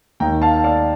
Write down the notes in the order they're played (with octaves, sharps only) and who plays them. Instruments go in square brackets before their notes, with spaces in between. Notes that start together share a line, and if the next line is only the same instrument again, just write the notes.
[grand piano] D#2 D#3 G5 A#5
F5 A5
D5 F5